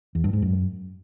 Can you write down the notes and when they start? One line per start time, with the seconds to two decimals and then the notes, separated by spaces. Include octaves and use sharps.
0.15 E2
0.24 G2
0.33 G#2
0.42 F#2